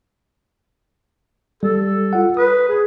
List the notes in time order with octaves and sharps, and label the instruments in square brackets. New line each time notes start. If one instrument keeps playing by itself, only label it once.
[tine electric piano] G3 [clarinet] A4
[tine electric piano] F4 F#5
[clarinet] B4 [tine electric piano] D#6
[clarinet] G#4